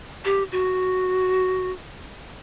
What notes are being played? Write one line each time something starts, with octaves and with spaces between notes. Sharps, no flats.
G4
F#4